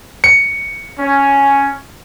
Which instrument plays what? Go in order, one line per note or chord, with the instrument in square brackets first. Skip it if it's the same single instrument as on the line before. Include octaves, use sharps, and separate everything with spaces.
[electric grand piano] C#7
[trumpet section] C#4